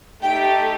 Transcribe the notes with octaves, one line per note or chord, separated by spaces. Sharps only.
A3 D#4 G4 G5